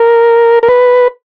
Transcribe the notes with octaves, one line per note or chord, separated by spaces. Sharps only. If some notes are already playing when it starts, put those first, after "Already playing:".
Already playing: A#4
A#4
B4